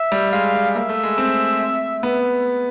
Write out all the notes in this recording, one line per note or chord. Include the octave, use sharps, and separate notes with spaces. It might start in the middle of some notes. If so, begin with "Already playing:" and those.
Already playing: E5
G3
G#3 F5
G#3
A#3 E5
A3
G#3
C4
B3